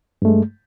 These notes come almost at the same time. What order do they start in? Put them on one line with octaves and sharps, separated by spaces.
G2 A3 G#3